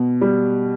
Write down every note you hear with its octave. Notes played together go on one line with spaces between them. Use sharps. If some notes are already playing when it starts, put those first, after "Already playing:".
Already playing: B2
G3